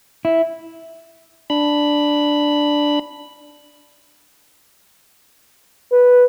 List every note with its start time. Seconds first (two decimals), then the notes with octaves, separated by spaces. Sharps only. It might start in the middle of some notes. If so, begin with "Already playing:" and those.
0.25 E4
1.50 D4 B5
5.92 B4